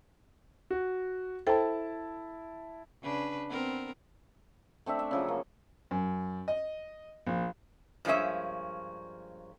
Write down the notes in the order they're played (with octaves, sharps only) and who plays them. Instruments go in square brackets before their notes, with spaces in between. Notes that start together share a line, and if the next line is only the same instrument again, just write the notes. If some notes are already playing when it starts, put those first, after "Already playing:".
[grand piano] F#4
[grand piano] E4 A5 [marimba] A4 C5 G5
[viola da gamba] C#3 D4 B4
B3 C4 A#4
[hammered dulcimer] A3 C4 D4 E5
E5
C#3 F3 F#3
A#3
[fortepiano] F#2
D#5
A#1
[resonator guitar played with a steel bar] G2 F3 G#3 A#3 C#4 E5